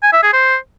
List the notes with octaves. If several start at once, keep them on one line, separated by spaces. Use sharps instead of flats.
G#5
E5
G#4
C5